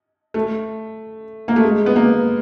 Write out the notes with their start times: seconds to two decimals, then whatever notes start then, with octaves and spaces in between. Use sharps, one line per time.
0.34 A3
1.48 A#3
1.56 A3
1.63 G#3
1.86 B3
1.96 A#3